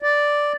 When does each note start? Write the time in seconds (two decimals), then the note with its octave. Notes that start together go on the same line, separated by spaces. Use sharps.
0.02 D5